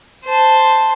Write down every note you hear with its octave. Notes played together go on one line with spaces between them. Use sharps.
C5 A5